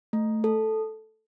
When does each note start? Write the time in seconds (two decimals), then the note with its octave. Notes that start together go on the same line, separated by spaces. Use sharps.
0.13 A3
0.44 A4